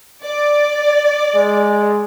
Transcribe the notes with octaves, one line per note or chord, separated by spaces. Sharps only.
D5
G#3